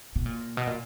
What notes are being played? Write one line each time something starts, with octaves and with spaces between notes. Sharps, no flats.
B2
A#2
B2
A#2